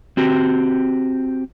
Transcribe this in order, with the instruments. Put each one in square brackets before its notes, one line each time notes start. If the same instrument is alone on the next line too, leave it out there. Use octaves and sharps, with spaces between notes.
[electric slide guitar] C4 F#4 G4